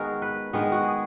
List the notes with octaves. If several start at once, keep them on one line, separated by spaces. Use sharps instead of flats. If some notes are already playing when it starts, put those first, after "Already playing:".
Already playing: D#3 G#3 B3 F#4 G#4 A#4
B4
D#3 G#3 B3
F#4
G#4